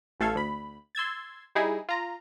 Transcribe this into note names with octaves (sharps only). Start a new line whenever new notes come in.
A1 A3 A4 F5 G#6
D2 B5
C6 E6 G#6 A6
G3 D#4 E4 G#4
F4 A#5